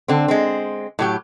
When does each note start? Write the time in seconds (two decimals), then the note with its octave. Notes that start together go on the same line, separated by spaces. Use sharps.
0.08 D3 C4
0.28 G#3 C4
0.99 A2 F#3 G4